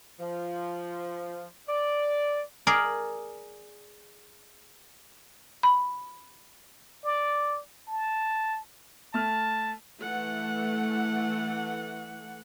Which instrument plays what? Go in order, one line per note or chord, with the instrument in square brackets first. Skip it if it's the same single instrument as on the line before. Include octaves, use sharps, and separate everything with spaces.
[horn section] F3
D5
[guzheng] G#4 A#4 D5
[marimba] B5
[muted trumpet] D5
A5
[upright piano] A3 F6 [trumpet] A5
[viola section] E3 A3 F#5